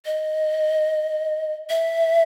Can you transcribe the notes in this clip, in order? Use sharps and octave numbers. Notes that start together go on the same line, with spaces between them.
D#5
E5